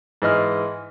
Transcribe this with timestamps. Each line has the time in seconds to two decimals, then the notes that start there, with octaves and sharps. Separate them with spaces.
0.22 G#2 E3 D#5 F6